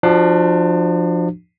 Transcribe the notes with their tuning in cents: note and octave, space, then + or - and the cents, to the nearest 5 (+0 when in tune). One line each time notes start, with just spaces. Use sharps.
F3 +0 D4 +30 F#4 +0